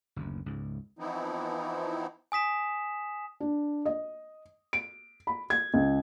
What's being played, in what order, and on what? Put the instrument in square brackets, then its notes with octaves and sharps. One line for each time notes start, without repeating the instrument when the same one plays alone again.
[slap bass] F#1 D2
C#2 G#2
[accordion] E3 F3 B3 C4 D#4 E4
[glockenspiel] G#5 D#6 B6 E7
[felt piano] D4
D#5
D7
B5
G#6
C#2